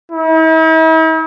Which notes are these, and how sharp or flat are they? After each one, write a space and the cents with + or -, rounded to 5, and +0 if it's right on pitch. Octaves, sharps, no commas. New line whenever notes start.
E4 -45